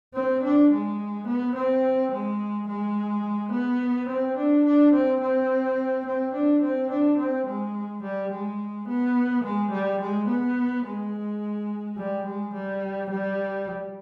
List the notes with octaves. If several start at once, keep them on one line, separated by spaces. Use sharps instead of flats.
C4
D4
G#3
B3
C4
G#3
G#3
B3
C4
D4
D4
C4
C4
C4
D4
C4
D4
C4
G#3
G3
G#3
B3
G#3
G3
G#3
B3
G#3
G3
G#3
G3
G3